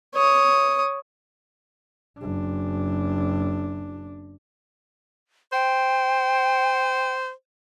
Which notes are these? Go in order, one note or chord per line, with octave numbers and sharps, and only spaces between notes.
C#5 D#6
F#1 D4
C5 G5